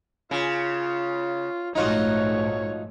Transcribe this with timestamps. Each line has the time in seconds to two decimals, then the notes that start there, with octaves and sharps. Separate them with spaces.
0.31 C#3 F4
1.75 A#1 G#2 A3 D#4 F4 F#4 C#5